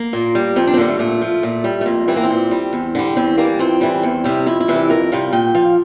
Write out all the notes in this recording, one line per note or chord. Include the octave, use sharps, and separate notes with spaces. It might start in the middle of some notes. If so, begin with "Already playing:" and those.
Already playing: A#3
A#2
G3
F2 C4
D4
C4
D3 G3 A#3
A3
A#2 A3
F3
A#2
G3
A3
F2 A#3
E3 G3 C4
A#3
C4
A#2
G3
E2
D3 G3
E2 C4
E3 G3 A#3
F2 C4
E3 G3
E2
C3 G3
F2 E4
E4
C3 E3 G3
E4
F2 A#4
C3 G3 F5
A#2 G5
F3 F5